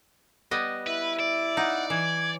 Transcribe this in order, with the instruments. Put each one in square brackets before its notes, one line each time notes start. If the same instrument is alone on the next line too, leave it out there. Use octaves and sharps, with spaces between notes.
[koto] G3 B3 D#5
[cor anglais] E4 [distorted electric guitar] B4
[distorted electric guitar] D5
[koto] D#4 [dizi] F#5
[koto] E3 [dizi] G#6